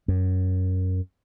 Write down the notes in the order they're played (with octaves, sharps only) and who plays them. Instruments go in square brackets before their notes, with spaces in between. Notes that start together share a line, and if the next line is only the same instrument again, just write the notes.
[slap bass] F#2